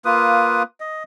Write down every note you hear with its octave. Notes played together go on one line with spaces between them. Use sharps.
A#3 F4 B4 D#6
D#5